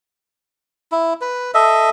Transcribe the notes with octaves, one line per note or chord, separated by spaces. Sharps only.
E4
B4
A4 D#5 E5